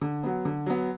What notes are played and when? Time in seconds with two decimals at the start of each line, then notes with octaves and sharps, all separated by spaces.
0.01 D3
0.24 F#3 B3
0.45 D3
0.66 F#3 B3